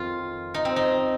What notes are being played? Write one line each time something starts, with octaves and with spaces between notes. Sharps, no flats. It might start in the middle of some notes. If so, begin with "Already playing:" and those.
Already playing: F2 D#3 F4
D#4
C4
D#4